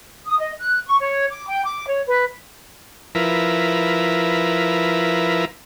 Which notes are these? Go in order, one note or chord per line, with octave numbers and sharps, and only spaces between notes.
D#6
D#5
F#6
C#6
C#5
D6
G5
D6
C#5
B4
F3 E4 A#4 B4